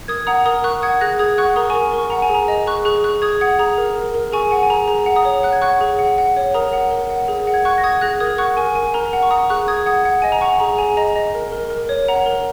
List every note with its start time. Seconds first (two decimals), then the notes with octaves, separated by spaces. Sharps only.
0.08 A#4 D#6 G#6
0.27 F#5 A#5 D#6
0.45 A#4 A#5 D#6
0.64 A#4 C#6 F#6
0.82 F#5 D#6 G#6
1.01 G#4 F#6 A#6
1.19 G#4 D#6 G#6
1.38 F#5 C#6 F#6
1.56 A#4 A#5 D#6
1.70 G#5 C#6
1.75 A#4
1.94 A#4 C#6
2.10 F#5 A#5
2.22 G#5
2.29 G#4
2.35 A#5
2.48 D#5
2.66 G#4 C#6 F#6
2.85 G#4 C#6 F#6
3.04 G#4 C#6 F#6
3.22 G#4 D#6 G#6
3.41 F#5 D#6 G#6
3.59 G#4 A#5 D#6
3.78 A#4
3.96 A#4
4.14 A#4
4.32 G#4 G#5 C#6
4.51 F#5 G#5
4.63 G#5
4.70 G#4 A#5
4.88 G#4 A#5
5.06 F#5
5.16 A#5 D#6
5.25 C#5
5.43 F#5 F#6
5.53 G#6
5.61 F#5 C#6 F#6
5.81 G#4
5.99 F#5
6.18 F#5
6.37 C#5
6.54 A#4 A#5 D#6
6.73 F#5
6.91 A#4
7.10 F#5
7.28 G#4
7.47 F#5
7.54 G#6
7.65 F#5 C#6 F#6
7.78 A#6
7.84 F#5 D#6 G#6
8.01 G#4 F#6 A#6
8.20 A#4 D#6 G#6
8.38 F#5 C#6 F#6
8.57 A#4 G#5 C#6
8.75 A#4 G#5
8.94 A#4 A#5
9.13 F#5
9.23 C#6
9.31 F#5 A#5 D#6
9.50 G#4 C#6 F#6
9.68 G#4 D#6 G#6
9.86 F#5 D#6 G#6
10.05 F#5
10.22 D#5 G#5
10.32 A#5
10.41 F#5 G#5 C#6
10.60 G#4 A#5
10.78 G#4 G#5
10.97 D#5 A#5
11.16 D#5
11.35 A#4
11.52 A#4
11.70 A#4
11.89 C#5
12.08 F#5 A#5
12.26 A#4